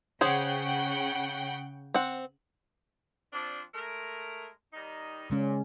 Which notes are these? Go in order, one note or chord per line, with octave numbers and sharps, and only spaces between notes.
C#3 C#4 G#4 C5 F#5 G5
C4 F#5
F3 C4 D4
G#3 A3 A#4
D#3 G3 D#4
A#2 C#3 G#3 C#4